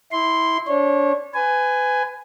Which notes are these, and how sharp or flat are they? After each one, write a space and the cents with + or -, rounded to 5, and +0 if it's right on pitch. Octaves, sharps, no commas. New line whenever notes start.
E4 -20 C6 -5
D4 -35 C#5 -30
B4 +30 G#5 +0